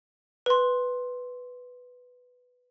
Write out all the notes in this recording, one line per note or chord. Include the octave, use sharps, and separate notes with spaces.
B4 C6